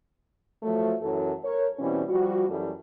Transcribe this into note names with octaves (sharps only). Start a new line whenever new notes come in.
F3 F#3 A3
F#2 E3 F#3 A4
A#4 C#5
B2 E3 G3 C4 C#4
F3 G3 F#4
F#2 E3 G3 A3